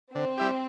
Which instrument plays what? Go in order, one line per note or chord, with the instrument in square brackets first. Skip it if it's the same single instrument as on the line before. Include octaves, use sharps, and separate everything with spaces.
[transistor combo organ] D3 [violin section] C4
[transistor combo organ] G3 E4 G4